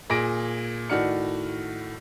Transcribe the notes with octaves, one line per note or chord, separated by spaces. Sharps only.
A#2 G#4 A#6 D7
A2 D#3 F#4 D5 F6 C#7